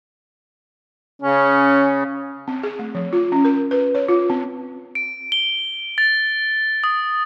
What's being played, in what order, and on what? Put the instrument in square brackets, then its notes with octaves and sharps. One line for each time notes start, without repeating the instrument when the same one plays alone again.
[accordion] C#3 [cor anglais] C#4
[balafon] C4
G#4
A3
F3
F4
C#4
A#4
B4
C#5
F4
C4
[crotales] D7
G7
A6
D#6